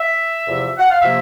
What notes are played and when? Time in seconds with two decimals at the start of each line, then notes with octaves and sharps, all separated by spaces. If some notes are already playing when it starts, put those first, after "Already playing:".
Already playing: E5
0.46 E2 C3 F3
0.79 F#5
0.90 F5
1.01 C3 F3 A#3 E5